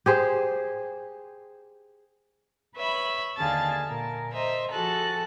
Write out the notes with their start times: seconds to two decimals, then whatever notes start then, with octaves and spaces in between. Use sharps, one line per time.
0.06 G4 G#4 C5
2.75 B4 C#5 E5 B5
3.38 D#2 D3 G#4 F5 A5 A6
3.86 A#2 A#4
4.31 C5 D#5 E5 A#5
4.72 F3 F#4 G#4 A4 A5 F#6